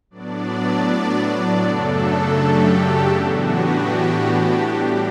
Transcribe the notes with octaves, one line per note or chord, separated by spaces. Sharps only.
A2 F#3 B3 D4 D5
F#2 C#3 F#3 A3 D4 A4
G4
A2 E3 B3 D4 F#4
G4
G4
A2 G3 D4